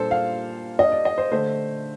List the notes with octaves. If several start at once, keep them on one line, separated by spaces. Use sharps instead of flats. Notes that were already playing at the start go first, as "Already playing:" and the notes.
Already playing: A#2 G3 A#3 D4 A4 C5
F5
D#5
D5
D#5
C5
D3 A3 D4 C5